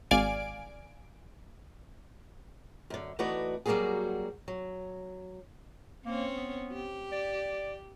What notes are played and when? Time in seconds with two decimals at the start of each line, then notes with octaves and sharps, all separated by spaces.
0.11 G#1 D5 F5 G#5 D7
2.90 F#2 D3
3.19 E3 A3 B3 D#4 F#4 D5
3.66 F#3 G3 A#3 B3 F#4 G#4
4.48 F#3
6.06 A#3 C4 C#4 C#5
6.36 B3
6.73 G4
7.12 D5